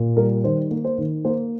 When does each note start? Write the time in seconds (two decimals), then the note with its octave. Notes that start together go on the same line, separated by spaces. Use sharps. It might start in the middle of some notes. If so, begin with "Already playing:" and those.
Already playing: A#2
0.17 G3 A#4
0.44 D#3 C5
0.71 A#3
0.84 C5
0.98 D#3
1.25 A#3 C5